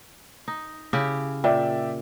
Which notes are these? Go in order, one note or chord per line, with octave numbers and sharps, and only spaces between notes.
D#4
C#3 E4 G4
A#2 D5 E5 G5